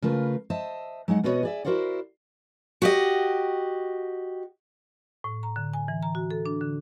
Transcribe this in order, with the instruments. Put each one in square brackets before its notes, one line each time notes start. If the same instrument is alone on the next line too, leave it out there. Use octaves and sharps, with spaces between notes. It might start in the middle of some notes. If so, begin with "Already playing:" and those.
[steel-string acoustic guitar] C#3 A3 F4 A#4 B4
C5 D#5 E5 A5
F#3 G#3 D#4 F#5
B2 B3 F#4 G#4 C#5 D#5
G#4 D5 E5
E4 F#4 A#4 C5 D5 F#5
F#4 G4 D#5
[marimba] A2
A#5
D3
G#5
E3
A#5
F#4
A4
D4
D3